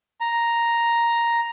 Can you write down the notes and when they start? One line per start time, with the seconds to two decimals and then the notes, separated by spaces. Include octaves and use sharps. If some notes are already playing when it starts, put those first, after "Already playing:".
0.21 A#5